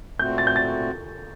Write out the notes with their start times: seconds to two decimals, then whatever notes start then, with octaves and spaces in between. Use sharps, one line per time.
0.19 A#2 A3 C4 F#4 G6
0.38 A6
0.47 G6
0.56 A6